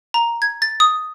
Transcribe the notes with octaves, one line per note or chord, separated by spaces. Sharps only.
A#5
G#6
A6
D#6